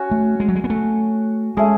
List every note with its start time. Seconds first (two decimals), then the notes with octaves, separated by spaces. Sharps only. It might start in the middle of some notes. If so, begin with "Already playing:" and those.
Already playing: C#4 F#4 C#5
0.11 A3
0.40 G#3
0.48 F#3
0.55 G#3
0.64 B3
0.70 A3
1.57 G#3 A3 C#4 G#4